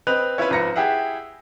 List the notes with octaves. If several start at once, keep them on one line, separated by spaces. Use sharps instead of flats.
C4 B4 D#5 F#6 F7
C#4 E4 F4 B4
G#1 F3 B4 A#5 A#6 C#7
E4 G4 G#4 E5 F#5